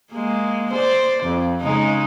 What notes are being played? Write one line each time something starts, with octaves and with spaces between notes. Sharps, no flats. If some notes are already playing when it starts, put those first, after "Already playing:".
G#3 A#3
C5 D5
F2
C#3 G#3 D#4